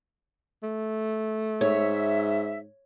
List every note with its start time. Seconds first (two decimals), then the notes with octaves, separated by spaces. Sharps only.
0.63 A3
1.61 G#2 C#5 E5